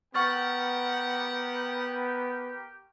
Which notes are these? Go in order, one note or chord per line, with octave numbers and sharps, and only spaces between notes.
B3 G4 A#4 F#5 G5 C#6 F6 A6